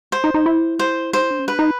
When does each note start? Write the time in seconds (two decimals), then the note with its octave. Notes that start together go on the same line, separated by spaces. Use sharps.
0.12 C5
0.24 D#4
0.34 D#4
0.46 E4
0.79 C5
1.13 D#4 C5
1.22 E4
1.31 D4
1.39 C#4
1.48 D4 B4
1.59 D#4